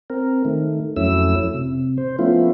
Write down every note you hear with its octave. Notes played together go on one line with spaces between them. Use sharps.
C4 A#4
D#3 A3
F2 F#3 A3 C#4 E4 E6
C3
C5
F3 A3 B3 C#4 E4 F4